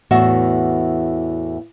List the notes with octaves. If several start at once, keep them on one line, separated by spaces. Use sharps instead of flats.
E2 A2 E3 F#4 E5